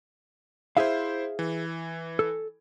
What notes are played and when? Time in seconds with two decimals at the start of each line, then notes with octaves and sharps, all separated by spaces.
0.77 E4 G#4 C5 E5 F5
1.39 E3
2.19 A4